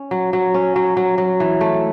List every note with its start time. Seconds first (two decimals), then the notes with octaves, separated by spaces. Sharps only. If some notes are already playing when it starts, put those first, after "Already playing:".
Already playing: C#4
0.11 F#3
0.33 F#3
0.54 C#4
0.76 F#3
0.97 F#3
1.18 F#3
1.40 E3
1.61 A3